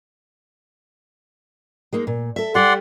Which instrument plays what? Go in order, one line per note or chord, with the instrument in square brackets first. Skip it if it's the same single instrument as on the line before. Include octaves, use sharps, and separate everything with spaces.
[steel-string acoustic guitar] G#3 A#3 D#4
A#2
A4 E5
[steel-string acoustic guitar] G3 G4 [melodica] D5 F#5 C6